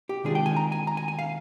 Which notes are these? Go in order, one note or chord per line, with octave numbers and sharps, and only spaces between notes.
G4
C3 D#3 G#3 D4 F4 G#4
G5
G#5
A#5
G#5
A#5
G#5
G#5
F5